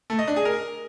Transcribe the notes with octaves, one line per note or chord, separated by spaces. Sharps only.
A3
D#5
D4
G#4
A#4